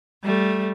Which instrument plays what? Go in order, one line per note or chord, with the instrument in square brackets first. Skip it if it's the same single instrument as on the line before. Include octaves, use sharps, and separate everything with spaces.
[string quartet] G3 A3